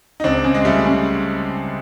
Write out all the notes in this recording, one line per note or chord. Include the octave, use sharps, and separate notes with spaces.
D#4
C#2 C4 D4
C#3
G#3
C#3 G3 A3
C#3